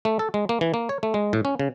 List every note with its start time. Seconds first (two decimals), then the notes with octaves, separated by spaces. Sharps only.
0.05 A3
0.19 A4
0.34 G#3
0.49 A#3
0.61 E3
0.74 A#3
0.89 C#5
1.03 A3
1.14 G#3
1.33 A2
1.45 C#4
1.59 C#3